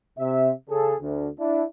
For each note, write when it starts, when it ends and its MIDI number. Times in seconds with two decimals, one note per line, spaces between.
0.19 0.51 48
0.19 0.51 76
0.70 0.94 49
0.70 0.94 68
0.70 0.94 69
1.01 1.28 38
1.40 1.64 62
1.40 1.64 64